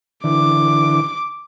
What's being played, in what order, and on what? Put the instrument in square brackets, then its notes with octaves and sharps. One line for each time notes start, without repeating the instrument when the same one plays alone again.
[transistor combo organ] D3 E3 [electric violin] D6